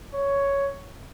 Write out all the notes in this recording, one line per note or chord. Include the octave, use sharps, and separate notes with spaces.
C#5